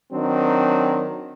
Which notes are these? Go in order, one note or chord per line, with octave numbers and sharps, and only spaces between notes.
D#3 F#3 C4 D4